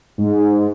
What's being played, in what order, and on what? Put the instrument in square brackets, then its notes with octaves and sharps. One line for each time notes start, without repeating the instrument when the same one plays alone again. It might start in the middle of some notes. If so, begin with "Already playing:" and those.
[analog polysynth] G#2